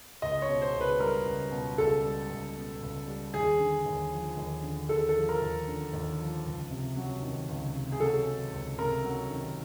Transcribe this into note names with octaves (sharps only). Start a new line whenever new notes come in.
C#2 D#5
C#5
B2
C5
C#2
B4
G3 A#4
C#2
B2
C#2 A4
G3
C#2
B2
C#2
G3
D#2 G#4
D3
D#2
F3
D#2
D3
D#2 A4
A4
F3
A#4
D#2
D3
D#2
F3
C#2
C3
F#3
D#3
C#2
C3
G#4
F#3 A4
D#3
C#2
C3 A#4
F#3
D#3